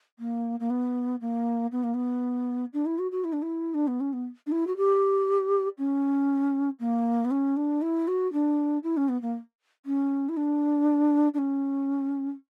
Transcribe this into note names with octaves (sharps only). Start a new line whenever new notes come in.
A#3
A#3
B3
A#3
B3
A#3
B3
D4
E4
F#4
F#4
E4
D4
E4
D4
B3
C#4
B3
D4
E4
F#4
G4
C#4
A#3
B3
C#4
D4
E4
F#4
D4
E4
C#4
B3
A#3
C#4
E4
D4
D4
C#4